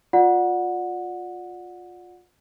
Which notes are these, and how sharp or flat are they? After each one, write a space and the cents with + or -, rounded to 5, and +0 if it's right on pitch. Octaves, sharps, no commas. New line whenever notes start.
F4 +20 D5 +5 F#5 -20